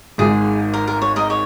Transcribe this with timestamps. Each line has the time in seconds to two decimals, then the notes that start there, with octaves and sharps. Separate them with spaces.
0.18 G#1 G#2 D#3 G#4
0.74 A#4
0.87 A#4
1.02 C#5
1.16 A#4 D#5
1.30 C#5